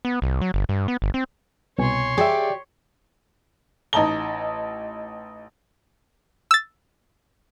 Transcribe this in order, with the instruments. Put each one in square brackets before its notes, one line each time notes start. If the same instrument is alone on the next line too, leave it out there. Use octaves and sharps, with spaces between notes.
[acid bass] B3
C2
F#3
G1
G2
B3
G1
C4
[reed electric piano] C2 B2 G#5 [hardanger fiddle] C#5 C6
[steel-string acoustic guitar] G4 D5 [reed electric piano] G#4 E5
[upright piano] A1 D#4 D#5 A5 A#5 G7
[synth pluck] E6 A6